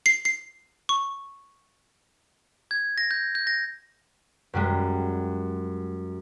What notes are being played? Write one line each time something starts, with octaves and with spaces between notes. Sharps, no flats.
C7
C7
C#6
G#6
A#6
G6
G6
A#6
F#2 G3 G#3